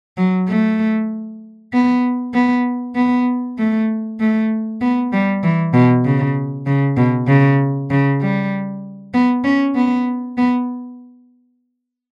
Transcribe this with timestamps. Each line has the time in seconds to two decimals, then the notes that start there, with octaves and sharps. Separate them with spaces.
0.17 F#3
0.48 A3
1.73 B3
2.34 B3
2.95 B3
3.58 A3
4.20 A3
4.81 B3
5.12 G3
5.43 E3
5.74 B2
6.05 C#3
6.66 C#3
6.97 B2
7.27 C#3
7.90 C#3
8.21 G3
9.14 B3
9.44 C#4
9.75 B3
10.37 B3